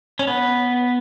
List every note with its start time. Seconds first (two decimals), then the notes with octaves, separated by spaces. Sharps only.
0.19 C#4
0.27 B3